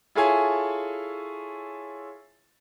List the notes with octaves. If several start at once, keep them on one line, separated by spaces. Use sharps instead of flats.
E4 F4 G#4 A4 C#5 G#5